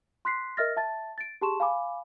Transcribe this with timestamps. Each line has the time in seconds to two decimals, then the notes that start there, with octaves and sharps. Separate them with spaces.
0.25 C6 F#6 B6 C7
0.57 A#4 D#5 E5 F6 A6 A#6
0.76 E5 A5 A6
1.18 A6 D7
1.41 G4 G#4 A5 C6 C#6 E7
1.60 F5 G#5 B5 D6